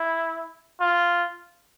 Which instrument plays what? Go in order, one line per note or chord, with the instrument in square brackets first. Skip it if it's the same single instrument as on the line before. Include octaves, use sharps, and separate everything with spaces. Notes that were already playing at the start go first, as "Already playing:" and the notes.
Already playing: [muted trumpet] E4
F4